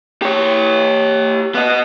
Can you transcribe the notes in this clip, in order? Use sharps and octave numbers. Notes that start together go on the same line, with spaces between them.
G4 C#5
B3 D#5